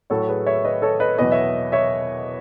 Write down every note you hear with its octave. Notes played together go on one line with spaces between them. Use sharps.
A2 F#3 A4 C#5
G#4 B4
C#5 E5
B4 D#5
A4 C#5
B4 D#5
E2 B2 F#3 B4 D#5
C#5 E5
C#5 E5